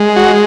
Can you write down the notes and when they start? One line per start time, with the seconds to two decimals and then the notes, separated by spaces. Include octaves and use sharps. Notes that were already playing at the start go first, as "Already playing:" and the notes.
Already playing: G#3
0.16 F#4